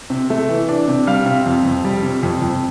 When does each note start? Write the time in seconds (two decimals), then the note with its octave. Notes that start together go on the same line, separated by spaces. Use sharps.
0.10 C3
0.30 A3
0.49 E3
0.69 D4
0.88 C3
1.07 G3 F5
1.26 C3
1.46 F2
1.65 F2
1.85 G3
2.03 C3
2.23 F2
2.42 F2